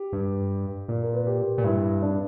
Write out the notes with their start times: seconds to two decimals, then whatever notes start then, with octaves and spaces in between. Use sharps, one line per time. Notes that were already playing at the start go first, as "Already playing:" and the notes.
Already playing: G4
0.13 G2
0.88 A#2
1.03 A#4
1.13 B4
1.27 G4
1.58 A#2
1.64 G2 E4
2.02 D4